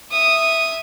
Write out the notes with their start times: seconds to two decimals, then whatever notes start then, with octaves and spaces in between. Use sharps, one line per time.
0.10 E5 D#6